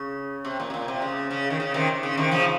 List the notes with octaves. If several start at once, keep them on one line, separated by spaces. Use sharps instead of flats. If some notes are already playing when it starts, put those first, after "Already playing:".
Already playing: C#3
C3
A#2
C3
A#2
C3
C#3
C#3
D#3
C#3
C3 D#3
C#3
C3 D#3
C#3 F3